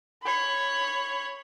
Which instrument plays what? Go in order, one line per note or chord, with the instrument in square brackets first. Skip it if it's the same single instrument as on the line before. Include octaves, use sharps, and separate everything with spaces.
[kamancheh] C#5 B5